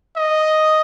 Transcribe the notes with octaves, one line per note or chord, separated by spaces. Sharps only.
D#5